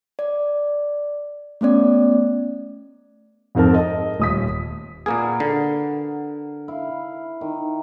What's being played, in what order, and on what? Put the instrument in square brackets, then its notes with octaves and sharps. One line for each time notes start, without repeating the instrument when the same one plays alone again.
[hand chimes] D5
A3 B3 C#4 D5
[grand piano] F2 G#2 C4 A#4 A5
D#5
D#1 D#6 B6
[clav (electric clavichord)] A#2 A#3 G#4 [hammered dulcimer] A#4 B4 F#5
[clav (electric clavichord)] D3
[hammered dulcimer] E4 F5
D#3